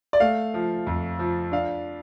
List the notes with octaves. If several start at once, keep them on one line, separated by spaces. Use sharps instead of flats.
D5
A3 F5
F3
F2
F3
D4 F5